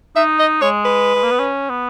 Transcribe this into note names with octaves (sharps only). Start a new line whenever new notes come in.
D#4 E5
D#5
G#3 C#5
B4
G#3
A#3
B3
C#4
B3